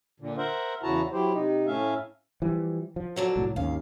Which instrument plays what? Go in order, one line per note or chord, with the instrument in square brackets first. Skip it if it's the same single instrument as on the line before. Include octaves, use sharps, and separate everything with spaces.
[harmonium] A#2 D3
A#4 C5 E5 F#5
E2 C#3 E4 F#4 A5 A#5
F#3 E4 G4 C5
C3 D#4
A2 A3 C#4 E5 F5
[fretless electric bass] E3 F3 G3
F3
[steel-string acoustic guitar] D3 F#3 D4
[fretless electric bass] C2 A2
[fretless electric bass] G#1 D#2 C#4 [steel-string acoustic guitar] F5